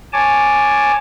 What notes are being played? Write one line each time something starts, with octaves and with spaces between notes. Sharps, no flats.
C#5 G#5 A5 D6